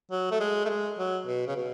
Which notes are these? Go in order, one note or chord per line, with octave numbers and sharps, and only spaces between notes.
F#3
A3
G#3
A3
G#3
F#3
B2
C#3
B2